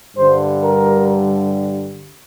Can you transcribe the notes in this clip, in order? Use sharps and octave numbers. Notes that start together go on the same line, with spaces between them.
G2 D3 G3 C5
A#4